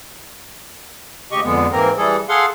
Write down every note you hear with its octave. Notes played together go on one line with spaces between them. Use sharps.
D2 C#3 G4 D#5 C#6
F2 D3 G#3 B3
G#2 E3 A#3 C4 A#4
E3 G3 A3 G#4 A4
G#4 A4 F5 F#5 C6